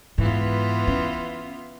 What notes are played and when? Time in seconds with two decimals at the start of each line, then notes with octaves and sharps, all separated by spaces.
0.18 G#2 E3 B3 F4
0.87 C#4